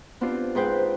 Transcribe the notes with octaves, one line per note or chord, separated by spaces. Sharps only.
B3 C4 D4 F4 G4
G#2 C4 G#4 B4 C5 G5